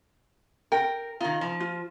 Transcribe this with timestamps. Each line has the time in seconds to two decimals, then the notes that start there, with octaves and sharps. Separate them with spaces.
0.72 A#4 G5
1.20 D#3 D#4 F4
1.41 F3
1.60 F4